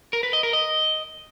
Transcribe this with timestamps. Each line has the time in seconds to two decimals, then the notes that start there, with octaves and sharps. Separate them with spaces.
0.13 A#4
0.23 B4
0.33 D#5
0.43 A#4
0.53 D#5